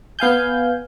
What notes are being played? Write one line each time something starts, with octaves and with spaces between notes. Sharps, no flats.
B3 F5 G#5 G6